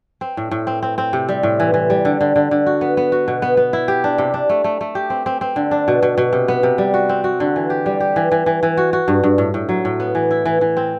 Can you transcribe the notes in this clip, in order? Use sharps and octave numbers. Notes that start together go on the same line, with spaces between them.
C4
A2
A2
C4
C4
C4
C3
G3
A2
E3
E3
G3
D3
D3
D3
D3
F#4
B3
B3
F#4
B2
B3
B3
E4
G4
D4
C3
D4
A3
A3
A3
G4
C4
C4
C4
D3
D4
B2
B2
B2
C3
B3
C3
G3
F#4
C4
F#4
D3
E3
G4
G3
G4
E3
E3
E3
E3
F#4
F#4
G2
G2
A2
A2
F#3
A2
B3
E3
E4
E3
E3
C4